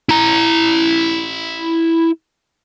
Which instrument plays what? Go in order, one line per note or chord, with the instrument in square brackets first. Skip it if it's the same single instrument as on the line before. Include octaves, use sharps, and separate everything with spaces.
[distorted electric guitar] E4 A#5